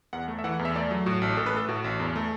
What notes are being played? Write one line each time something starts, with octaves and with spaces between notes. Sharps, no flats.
E2 F#5
A3
E5
E3 F#5
E2
E5
A3 D5
F#3
A2 F#4
A1
A1 A4
B4
A3 A4
A2 F#4
A1
E2
A3